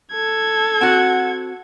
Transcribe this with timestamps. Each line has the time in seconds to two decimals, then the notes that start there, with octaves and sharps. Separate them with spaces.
0.12 A4 G#6
0.81 C4 F#4 F#5